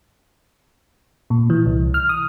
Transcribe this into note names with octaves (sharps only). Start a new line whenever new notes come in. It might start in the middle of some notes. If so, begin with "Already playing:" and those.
A#2
E3
C2
F6
D#6